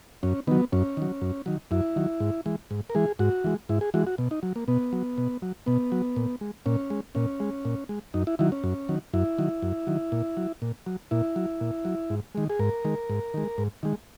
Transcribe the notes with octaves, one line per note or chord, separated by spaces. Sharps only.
F#2 C#4
D#3 F#3 B3
F#2 C#4
D#3 F#3
F#2
D#3 F#3
F#2 E4
D#3 F#3
G#2
E3 G#3
G#2
A#4
E3 G#3 G#4
G#2 F#4
E3 G#3
G#2 E4
G#4
E3 G#3 F#4
F#4
B2
D#4
F#3
A#3
B2 B3
F#3
B2
F#3
B2 B3
F#3
A#2
G#3
A#2 C#4
G#3
A#2 C#4
G#3
A#2
G#3
F#2 D#4
E4
D#3 F#3 E4
C#4
F#2
D#3 F#3
F#2 E4
D#3 F#3
F#2
D#3 F#3
A#2
F#3
A#2
F#3
A#2 E4
F#3
A#2
F#3
G#2
D#3 G#3
G#4
G#2 A#4
D#3 G#3
G#2
D#3 G#3
G#2
D#3 G#3